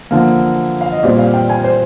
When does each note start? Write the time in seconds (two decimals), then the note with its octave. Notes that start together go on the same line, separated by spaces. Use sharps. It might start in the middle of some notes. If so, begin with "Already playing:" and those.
0.11 D3 F3 A#3
0.81 F5
0.92 D#5
1.03 A#2 G3 C4 D5
1.19 F5
1.34 G5
1.49 G#5
1.64 C5